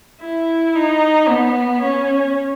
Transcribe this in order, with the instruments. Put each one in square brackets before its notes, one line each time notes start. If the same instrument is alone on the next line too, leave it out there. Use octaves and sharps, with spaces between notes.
[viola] E4
D#4
B3
C#4